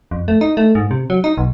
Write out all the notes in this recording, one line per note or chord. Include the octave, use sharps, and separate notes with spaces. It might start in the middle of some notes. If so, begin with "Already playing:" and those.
F2
A3
D#4
A3
G#2
C3
F#3
D#4
B1